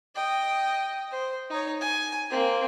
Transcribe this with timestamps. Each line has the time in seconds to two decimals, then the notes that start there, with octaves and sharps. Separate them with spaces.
0.16 D#5 G5
1.11 C5
1.50 D#4 C#5
1.81 G#5
2.30 A#3 C4